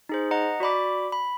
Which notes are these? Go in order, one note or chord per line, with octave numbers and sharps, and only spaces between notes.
D#4 G#4 C5
D#5 F#5 A#5 C#7
F#4 D5 B5 D6
B5